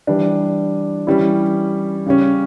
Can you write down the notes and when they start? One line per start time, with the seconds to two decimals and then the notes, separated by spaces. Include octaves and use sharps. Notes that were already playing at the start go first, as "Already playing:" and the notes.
0.07 E3 G3 D4
1.07 E3 G3 C#4 E4
2.06 C#3 G3 C#4